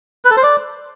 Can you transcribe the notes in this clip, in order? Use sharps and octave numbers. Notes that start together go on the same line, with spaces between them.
B4
A4
C5
D5